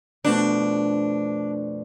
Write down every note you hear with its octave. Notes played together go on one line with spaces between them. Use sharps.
F2 B2 A3 D4